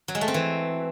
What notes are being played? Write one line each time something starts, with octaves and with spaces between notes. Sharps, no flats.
F#3
G#3
A3
C4
E3